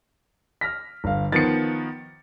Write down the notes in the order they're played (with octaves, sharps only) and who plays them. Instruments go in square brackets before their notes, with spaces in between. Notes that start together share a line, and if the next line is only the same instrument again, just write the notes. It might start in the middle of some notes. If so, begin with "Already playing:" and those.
[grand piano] F6 A#6 B6
G1 F5
[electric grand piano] D#3 F3 B3 [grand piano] A6 C#7